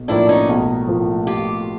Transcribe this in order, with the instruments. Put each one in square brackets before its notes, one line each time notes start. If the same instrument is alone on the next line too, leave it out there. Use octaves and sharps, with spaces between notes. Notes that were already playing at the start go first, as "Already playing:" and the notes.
Already playing: [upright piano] B1
[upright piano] A2 F3 A#3 [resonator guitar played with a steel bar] D4 E4
[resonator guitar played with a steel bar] C#4 D#4
[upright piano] B1
A2 F3 A#3
[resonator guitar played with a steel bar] F4 G4